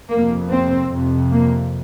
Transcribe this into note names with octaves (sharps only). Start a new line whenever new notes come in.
F2 C3 A#3
C4
F2 C3
A#3